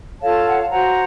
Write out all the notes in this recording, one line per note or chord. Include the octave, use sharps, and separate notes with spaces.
F4 A4 C#5 F5 A5
F#5
A5
F#4 C5 F#5 A#5